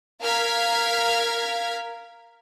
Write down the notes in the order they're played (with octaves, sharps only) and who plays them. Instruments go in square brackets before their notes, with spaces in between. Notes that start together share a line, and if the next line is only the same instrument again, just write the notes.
[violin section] A#4 F5 A#5 F6 G#6 B6